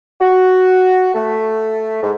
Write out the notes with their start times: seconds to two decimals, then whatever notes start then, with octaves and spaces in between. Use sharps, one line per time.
0.20 F#4
1.14 A3
2.02 G#2